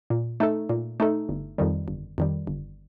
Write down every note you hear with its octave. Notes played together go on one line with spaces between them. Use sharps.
A#2
A3 D#4 A4
A#2
A3 D#4 A4
G1
F2 D#3 G3
G1
F2 D#3 G3
G1